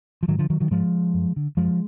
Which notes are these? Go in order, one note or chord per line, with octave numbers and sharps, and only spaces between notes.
F3
G#2 D#3 F#3
D3 F3
D#3 F#3
D#3 F#3
G#2 F3 G#3
F#2
D3
F#2 F3 G#3